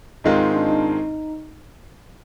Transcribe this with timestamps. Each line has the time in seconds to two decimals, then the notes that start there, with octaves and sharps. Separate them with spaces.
0.24 G#2 D#3 G#3 C4 D#4 F4
0.39 D#4
0.55 D4
0.69 D#4